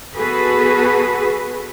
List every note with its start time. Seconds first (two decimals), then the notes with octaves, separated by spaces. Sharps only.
0.15 B3 F#4 G#4 A4 B4